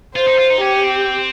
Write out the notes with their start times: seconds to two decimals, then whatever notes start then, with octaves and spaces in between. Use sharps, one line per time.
0.15 F4 C5
0.27 D#4
0.39 F4
0.50 D#4
0.61 C#4 G4
0.83 C4